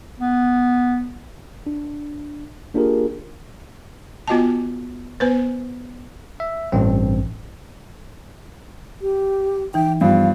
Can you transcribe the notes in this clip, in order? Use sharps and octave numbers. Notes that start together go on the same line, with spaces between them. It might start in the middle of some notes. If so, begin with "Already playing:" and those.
B3
D4
A#3 D4 F4 G4 G#4 A#4
B3 F4 F#4 D#5 G5 A5
B3 B4 C5
E5
A1 G2 C4
G4
E3 D#4 G5
G2 F3 B3 F5